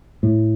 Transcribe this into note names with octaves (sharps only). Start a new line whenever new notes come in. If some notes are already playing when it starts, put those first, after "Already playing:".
A2